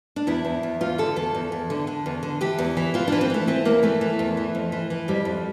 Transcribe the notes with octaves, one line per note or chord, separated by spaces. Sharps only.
D4
E2 E4
E2
E2
E2 F4
D3 A4
E2 A4
E2
E2
D3
D3
E2
D3
E3 G4
E2
E3
E3 F4
D4
E3
C4
E3 A3
E3 C4
E2 A#3
E3 A3
E3
E2
E3
F2
E3
E3
F2 G3
F2